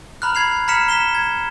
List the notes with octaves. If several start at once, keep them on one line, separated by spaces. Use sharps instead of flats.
A#5 B5 F6 F#6
B5 G#6 C7 F7
A#5 B5 F6 B6 C#7 E7
A#5 B6 E7 G7
G#6